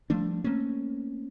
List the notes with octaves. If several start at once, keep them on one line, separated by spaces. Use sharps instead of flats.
F3 G3 A3 D4
A3 A#3 C4 C#4